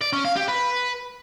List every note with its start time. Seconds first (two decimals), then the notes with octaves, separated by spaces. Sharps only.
0.01 D5
0.13 C#4
0.25 F5
0.36 G4
0.48 B4